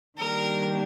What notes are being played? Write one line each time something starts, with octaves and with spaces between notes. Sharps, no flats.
D#3 G3 A#3 D4 G4 A#4